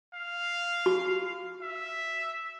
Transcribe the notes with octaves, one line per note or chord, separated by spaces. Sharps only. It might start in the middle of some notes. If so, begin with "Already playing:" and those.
F5
F#4
E5